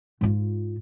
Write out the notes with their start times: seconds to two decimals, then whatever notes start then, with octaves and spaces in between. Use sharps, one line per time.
0.21 G#2 F4